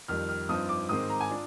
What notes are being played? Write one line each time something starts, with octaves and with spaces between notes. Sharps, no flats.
F2 D#3 G3 F6
F6
G2 F3 C4 D#4 D#6
D6
G#2 D#3 G#3 C4 D#6
A#5
G#5
D4 F4